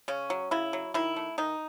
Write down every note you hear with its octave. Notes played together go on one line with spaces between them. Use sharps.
C#3 C#4
F#3
C#3 E4
F#3
D#3 E4
A3
D#3 D#4